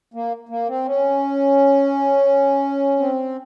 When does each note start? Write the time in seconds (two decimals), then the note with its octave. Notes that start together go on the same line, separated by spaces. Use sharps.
0.14 A#3
0.49 A#3
0.68 C4
0.86 C#4
2.99 C4